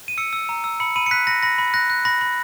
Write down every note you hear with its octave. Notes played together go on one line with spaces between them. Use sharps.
D#7
E6 C#7
E6
A#5
E6
B5 C#7
B5 D#7
C#7
F#6 B6
B5 A#6
B5 A#6
B5
F#6 A#6
F#6
B5 A#6
B5